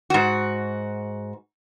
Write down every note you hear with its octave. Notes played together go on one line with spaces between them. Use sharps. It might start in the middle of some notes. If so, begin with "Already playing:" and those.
G#2 F#4